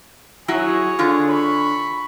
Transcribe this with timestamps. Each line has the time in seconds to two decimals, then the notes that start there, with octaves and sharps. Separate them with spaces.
0.48 F#3 E4 F#4 G#4 C#5
0.99 D3 F4
1.29 B5 C#6